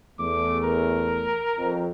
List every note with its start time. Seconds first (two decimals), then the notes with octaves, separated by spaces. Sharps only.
0.19 E2 A3 D6
0.64 A#4
1.57 F2